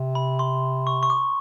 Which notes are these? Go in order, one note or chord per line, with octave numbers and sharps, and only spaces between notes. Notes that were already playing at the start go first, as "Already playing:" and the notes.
Already playing: C3
B5
C6
C#6
C#6
D6